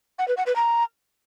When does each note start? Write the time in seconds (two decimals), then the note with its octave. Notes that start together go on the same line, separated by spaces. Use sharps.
0.19 F#5
0.28 B4
0.37 F#5
0.46 B4
0.56 A#5